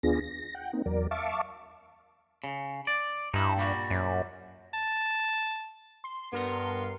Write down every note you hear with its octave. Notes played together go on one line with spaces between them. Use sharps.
D#2 B3 D4 F4 G#4 A#6
A#6
F#5 G5
A#3 C4 D#4
E2 F#3 A#4 D5
E5 F5 A5 C#6 D6
C#3
D5
G2 D#4 E4
A#2 G3 F#4
F#2
A5
C6
G2 B3 A#4 C6